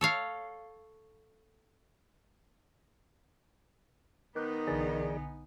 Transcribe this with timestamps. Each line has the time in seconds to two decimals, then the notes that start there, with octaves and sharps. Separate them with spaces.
0.01 A4 C#5 F5
4.36 D#3 B3 D#4 B4 D6 G6
4.67 B1 D3 E3 G#4 D5 G#5